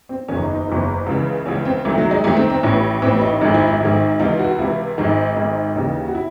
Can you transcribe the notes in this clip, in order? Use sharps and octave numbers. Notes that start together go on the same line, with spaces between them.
C4
F#1 E2 D#3 C#4
D#4
D#4
F#1 E2 D#3
C#2 C#3 E3
C#2 C#3 E3 C#4
C4
C2 C3 D#3 A3
F#3
G#3
C2 C3 D#3 A3
C4
C4
A1 A2 E3 C#4
A1 A2 E3 C4
D#4
G#1 G#2 D#3 D#4
E4
E4
G#1 G#2 D#3
C#2 C3 E3 D#4
F#4
C#2 C3 E3 E4
G#1 G#2 D#3 D#4
G#1 G#2 D#3
D#2 C#3 E3 D#4
F#4
E4